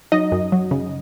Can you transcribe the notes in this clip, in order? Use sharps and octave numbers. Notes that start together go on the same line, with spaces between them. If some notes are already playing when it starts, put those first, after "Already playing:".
F#3 D#4 D#5
F#2
F#3
C#3